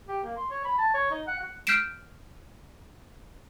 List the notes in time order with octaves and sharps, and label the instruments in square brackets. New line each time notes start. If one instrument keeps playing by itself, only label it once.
[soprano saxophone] G4
A#3
C6
C#5
B5
A5
C#5
D#4
F#5
F#5
[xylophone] F6 G6 B6 C7 D7 E7